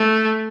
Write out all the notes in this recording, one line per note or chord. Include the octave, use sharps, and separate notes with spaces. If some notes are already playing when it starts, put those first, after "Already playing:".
Already playing: A3